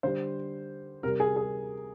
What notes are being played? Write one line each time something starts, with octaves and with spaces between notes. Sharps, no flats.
D3 G3 C5
C3 G3 A#4
G#4
G#4